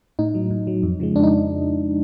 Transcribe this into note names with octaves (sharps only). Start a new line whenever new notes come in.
A2 D#4
F#3
A2
F#3
F2
C#3 F3 G#3
F2 D4
D#4